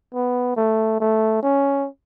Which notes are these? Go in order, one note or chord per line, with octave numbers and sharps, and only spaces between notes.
B3
A3
A3
C#4